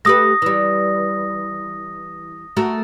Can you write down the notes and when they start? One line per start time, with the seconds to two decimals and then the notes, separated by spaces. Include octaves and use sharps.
0.05 A3 G4 B4 D#6 A#6
0.42 E3 G3
2.57 A3 F#4 A#4